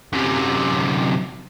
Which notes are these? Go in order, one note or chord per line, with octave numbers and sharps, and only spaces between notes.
F#2 C3